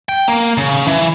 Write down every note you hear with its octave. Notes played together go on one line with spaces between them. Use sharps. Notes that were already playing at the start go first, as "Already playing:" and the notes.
G5
A#3
C#3
E3